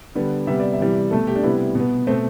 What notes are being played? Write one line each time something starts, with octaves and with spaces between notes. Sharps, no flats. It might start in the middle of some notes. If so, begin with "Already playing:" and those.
D3 G3 B3
C3 G3 B3 E5
D5
E5
C3 E3 G3
B2 A3 A4
G4
D4
C3 G3 B3 E4
B2 B3
B2 A3 C4